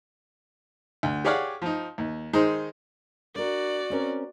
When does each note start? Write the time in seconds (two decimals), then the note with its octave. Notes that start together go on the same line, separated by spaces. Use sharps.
1.03 D2
1.25 G4 G#4 C#5 D5 F5 F#5
1.62 F3 D#4
1.98 D#2
2.33 D#3 G#3 D#4 G#4 C5
3.36 D4 F#4 A#4 D5
3.90 C4 C#4 A#4